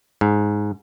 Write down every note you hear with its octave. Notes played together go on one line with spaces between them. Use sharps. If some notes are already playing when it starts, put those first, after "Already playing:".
G#2